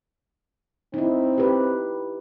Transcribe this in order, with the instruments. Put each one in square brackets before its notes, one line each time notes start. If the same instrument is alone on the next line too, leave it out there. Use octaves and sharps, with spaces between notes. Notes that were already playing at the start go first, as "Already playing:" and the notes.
[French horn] C4 [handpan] D#4 E4
[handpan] G4 B4